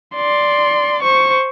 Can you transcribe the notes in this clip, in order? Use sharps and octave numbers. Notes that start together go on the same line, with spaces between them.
D5 C6
C5 C#6